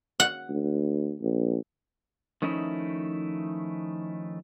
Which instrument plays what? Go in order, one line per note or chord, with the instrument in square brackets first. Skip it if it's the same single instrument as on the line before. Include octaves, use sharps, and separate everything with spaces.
[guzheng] F#5
[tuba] D2
A#1
[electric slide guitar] D#3 F3 A3 C#4 D#4 E4